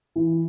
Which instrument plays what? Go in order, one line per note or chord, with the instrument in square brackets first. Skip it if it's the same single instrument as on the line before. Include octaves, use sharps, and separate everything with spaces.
[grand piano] E3